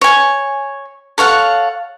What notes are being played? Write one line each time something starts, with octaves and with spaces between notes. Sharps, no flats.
C#5 G#5
A4 C#5 F5 F#5